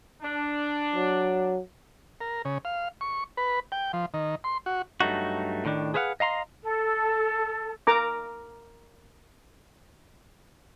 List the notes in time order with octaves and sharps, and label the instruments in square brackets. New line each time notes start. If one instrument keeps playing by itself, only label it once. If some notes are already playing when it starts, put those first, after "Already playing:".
[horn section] D4
[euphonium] F#3
[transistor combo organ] A#4
C#3
F5
C#6
B4
G5
F3
D#3
C6
F#4
[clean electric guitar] G2 F#3 A3 D#4 F#4
A2 D#3 D4
G#4 B4 C5 F5 F#5
D#5 F5 A#5 C6
[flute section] A4
[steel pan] A#4 A#5 D6